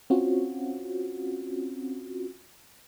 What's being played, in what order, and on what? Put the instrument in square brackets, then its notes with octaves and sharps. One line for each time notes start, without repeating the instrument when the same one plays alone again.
[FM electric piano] C4 C#4 F4 F#4